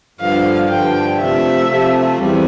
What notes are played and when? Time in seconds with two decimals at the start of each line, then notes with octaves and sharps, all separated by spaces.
0.19 G2 D3 F3 F5
0.69 G2 D3 F3 G5
1.19 C3 F3 A3 E5
1.68 C3 F3 A3
2.18 E2 C3 G3